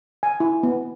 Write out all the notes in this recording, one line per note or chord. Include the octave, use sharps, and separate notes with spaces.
G#5
E4
B3